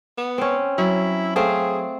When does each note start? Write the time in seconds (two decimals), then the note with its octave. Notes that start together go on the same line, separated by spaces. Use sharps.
0.18 B3
0.38 C4 C#4
0.78 F#3 E4
1.36 A3 C4 G#4 F5